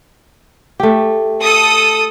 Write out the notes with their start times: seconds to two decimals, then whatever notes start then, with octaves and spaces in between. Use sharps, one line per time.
0.80 A3 G4
1.42 A4 D#6